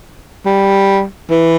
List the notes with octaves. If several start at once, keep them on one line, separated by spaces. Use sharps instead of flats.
G3
E3